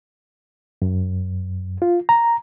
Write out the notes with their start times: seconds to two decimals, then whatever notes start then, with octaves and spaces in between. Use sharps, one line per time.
0.82 F#2
1.82 F4
2.09 A#5